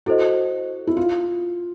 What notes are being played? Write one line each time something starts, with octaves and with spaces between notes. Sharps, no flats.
E4 F#4 A4 C5 D#5
E4
F4